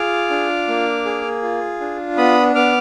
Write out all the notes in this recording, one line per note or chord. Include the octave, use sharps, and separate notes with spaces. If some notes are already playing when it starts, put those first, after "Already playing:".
Already playing: F4 G#4 D6 F6
D4
A#3
G#4
F4
D4
B3 B5 D#6
B3 D6 F6